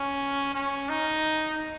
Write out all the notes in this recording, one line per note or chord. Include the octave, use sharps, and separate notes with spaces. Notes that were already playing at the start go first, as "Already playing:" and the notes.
Already playing: C#4
C#4
D#4